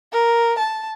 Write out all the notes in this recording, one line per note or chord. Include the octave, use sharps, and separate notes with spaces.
A#4
A5